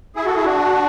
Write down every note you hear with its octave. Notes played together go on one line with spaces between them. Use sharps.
E4 G#4
F#4 A4
E4 G#4
D4 F#4